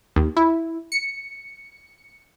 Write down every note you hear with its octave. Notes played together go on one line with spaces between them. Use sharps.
D#2
E4
C#7